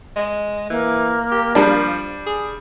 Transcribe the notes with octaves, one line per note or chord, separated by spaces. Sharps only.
G#3
E3 A#3
G4
F3 G3 D4
G#4